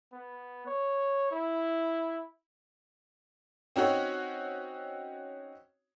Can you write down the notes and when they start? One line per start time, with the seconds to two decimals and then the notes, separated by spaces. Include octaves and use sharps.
0.13 B3
0.67 C#5
1.32 E4
3.76 C4 C#4 D#4 F#4 C#5